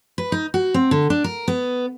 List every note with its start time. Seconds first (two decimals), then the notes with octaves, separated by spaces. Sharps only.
0.18 B4
0.32 D#4
0.54 F#4
0.74 C4
0.91 D3
1.10 D4
1.24 A#4
1.48 B3